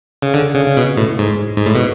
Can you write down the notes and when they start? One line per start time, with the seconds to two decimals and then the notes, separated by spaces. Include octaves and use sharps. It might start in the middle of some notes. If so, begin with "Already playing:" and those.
0.22 C#3
0.34 D3
0.55 C#3
0.66 C#3
0.77 B2
0.97 A2
1.19 G#2
1.57 G#2
1.66 A2
1.75 B2